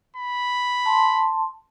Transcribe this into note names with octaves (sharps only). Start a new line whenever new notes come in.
B5
A5 C6